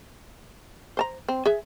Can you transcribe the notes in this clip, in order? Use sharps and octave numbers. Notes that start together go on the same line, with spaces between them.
C5 A5 A#5
C4
G#4 E5